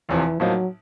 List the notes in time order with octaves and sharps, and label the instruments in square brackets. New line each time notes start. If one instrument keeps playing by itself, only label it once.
[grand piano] F1 E2 C3 F3 [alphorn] E3
[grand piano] A2 F3 A#3 D#4 [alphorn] F#3